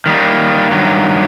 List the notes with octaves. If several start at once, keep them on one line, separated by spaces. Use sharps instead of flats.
D#3 G3 A#3
G2 D#3 F#3